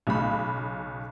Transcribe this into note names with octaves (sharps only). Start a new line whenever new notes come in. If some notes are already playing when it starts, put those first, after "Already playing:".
B1 C#3 B5